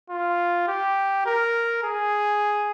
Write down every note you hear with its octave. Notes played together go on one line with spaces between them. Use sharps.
F4
G4
A#4
G#4